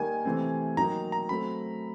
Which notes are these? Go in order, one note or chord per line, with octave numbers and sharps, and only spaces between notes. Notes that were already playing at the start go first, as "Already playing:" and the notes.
Already playing: D#3 G3 A#3 D#4 G#5
C3 E3 A3 C4
D#3 F#3 A#3 D#4 A#5
A#5
F#3 A3 C4 B5